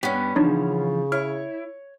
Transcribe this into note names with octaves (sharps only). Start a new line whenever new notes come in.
G2 B3 C#4 D4 G4
C#3 E3 F3 D4 D#4 C#5
E4 C#5 F6